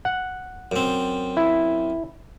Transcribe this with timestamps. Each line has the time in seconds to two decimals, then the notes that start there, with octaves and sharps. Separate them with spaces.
0.05 F#5
0.72 F#2 C4
1.37 E4